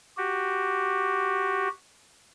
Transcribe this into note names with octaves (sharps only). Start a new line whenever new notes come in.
F#4 G4